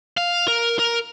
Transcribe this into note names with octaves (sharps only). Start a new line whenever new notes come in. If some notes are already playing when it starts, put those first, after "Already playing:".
F5
A#4
A#4